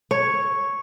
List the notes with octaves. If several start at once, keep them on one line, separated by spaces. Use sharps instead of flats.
C#5